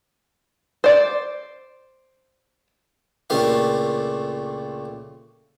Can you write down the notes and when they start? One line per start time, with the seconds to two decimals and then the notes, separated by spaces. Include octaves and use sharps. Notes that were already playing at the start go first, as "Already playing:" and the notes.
0.84 C5 D5
3.30 C#2 A#2 A3 D4 G4 F5